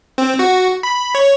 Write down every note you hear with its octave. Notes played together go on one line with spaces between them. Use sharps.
C4
F#4
B5
C#5